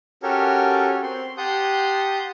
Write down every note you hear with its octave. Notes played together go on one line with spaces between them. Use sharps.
C#4 F#4 G4 A4 A#4 C#5
C4 C6
G4 F#5 A5 C6 D#6 G6